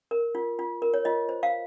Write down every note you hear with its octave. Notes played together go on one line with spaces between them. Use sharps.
A#4
F4
F4
A#4
C#5
F4 D#5
C5
F5